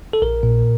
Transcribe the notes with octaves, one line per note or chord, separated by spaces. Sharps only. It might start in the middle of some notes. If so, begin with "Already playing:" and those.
A4
A#1 A#4
A#2